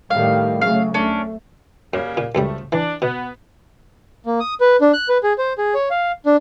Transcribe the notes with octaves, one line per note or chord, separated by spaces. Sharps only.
A2 D#3 G3 F5
C#3 F#3 A3 F5
C2 A3 C#4 D4
F#2 C#3 G3 A#3
A#2
C#2 F#2 F3 G3 A3
E3 D4
B2 B3
A#3
D#6
B4
D4
F#6
B4
G#4
C5
G#4
C#5
F5
D4